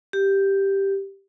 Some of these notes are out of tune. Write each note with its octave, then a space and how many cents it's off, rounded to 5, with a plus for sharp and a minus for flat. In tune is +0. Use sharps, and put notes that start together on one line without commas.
G4 +0